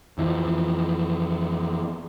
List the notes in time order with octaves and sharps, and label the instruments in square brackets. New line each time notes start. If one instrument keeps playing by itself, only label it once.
[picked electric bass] F2 E3 F3